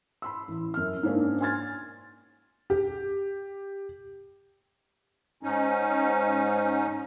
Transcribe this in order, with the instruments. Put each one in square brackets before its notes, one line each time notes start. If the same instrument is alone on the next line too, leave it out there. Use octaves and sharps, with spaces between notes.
[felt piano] B5 C6 E6
A1
F#2 F6
G#2 A#3 C#4 D4
G#5 C6 F6 G#6 A6
[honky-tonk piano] G4
[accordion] G#2 C#4 D#4